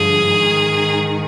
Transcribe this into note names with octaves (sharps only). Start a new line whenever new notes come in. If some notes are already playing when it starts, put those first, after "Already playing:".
Already playing: G2 D3 F3 G#4
G#2 D#3